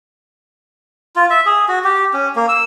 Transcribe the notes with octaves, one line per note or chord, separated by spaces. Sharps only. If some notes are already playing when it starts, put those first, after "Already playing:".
F4
E5
G#4
F#4
G4
C#4
A#3
E6